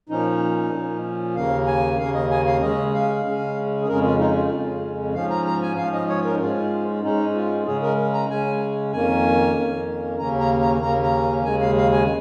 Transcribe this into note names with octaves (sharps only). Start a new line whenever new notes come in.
A#2 F3 C#4 D#4
A#2 F3 C#4
D#2 C#3 A#3 F5
G#5
D#2 C#3 A#3 F5
D#5
G#5
F5
C#3 G#3 C#4 D#5
F5
C#3 G#3 C#4
G#4
F2 C#3 G#3 C#4 A#4
F4
D#4
F4
F2 C#3 G#3 C#4
G#2 F3 C#4 F5
A#5
A#5
G#5
G#2 F3 C#4 F5
D#5
C#5
A#4
D#4
G#2 G#3 C#4 F4
G#2 G#3 C#4 D#4
F4
C#3 G#3 C#4 G#4
A#4
A#5
C#3 G#3 C#4 G#5
F2 D#3 A#3 C#4 G#5
F2 D#3 A#3 C#4
D#2 C#3 A#3 C#4 A#5
A#5
A#5
D#2 C#3 A#3 C#4 A#5
A#5
D#2 C#3 G#3 G#5
F5
F5
G#5